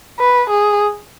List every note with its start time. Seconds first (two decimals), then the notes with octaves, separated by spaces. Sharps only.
0.19 B4
0.50 G#4